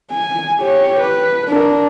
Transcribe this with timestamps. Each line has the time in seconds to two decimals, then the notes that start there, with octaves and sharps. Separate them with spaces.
0.12 G#5
0.60 G4 C#5
1.01 B4
1.49 D4 A#4